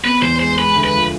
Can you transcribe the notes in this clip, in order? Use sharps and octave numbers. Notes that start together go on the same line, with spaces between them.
B3 B4
E2 C5
G#3 C5
G#3 B4
D2
B4
F3